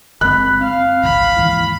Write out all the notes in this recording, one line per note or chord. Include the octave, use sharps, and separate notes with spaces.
F#1 G#3 C4 B5 F#6
C4 F5
G#1 C#2 B5
D#2 G#2 E3